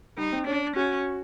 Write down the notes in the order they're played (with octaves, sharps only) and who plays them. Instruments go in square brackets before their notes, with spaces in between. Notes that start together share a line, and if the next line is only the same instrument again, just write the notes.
[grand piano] G3 [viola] D#4
[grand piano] C4
[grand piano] C#4 [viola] D4
[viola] C#4 [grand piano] F#4